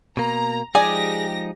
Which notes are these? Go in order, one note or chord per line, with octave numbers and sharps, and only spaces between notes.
B2 A#3 A#5
F3 G#3 D#4 G4 G#4 D5 G#5 A#6